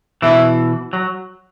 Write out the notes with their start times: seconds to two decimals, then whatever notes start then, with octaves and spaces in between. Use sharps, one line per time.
0.22 B2 E3 E4
0.93 F#3